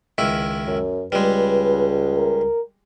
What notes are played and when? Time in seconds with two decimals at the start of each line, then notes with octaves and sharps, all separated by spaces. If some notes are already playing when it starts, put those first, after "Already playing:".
0.18 C#2 D#3 E4
0.67 F#2
1.12 C#2 G3 G#3 B4
2.17 A#4